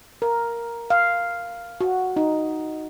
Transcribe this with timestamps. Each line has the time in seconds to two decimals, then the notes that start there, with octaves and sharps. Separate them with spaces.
0.22 A#4
0.90 F5
1.81 F#4
2.16 D#4